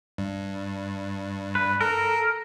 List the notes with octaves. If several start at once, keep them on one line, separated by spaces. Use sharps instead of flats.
G2
B4
A4 A#4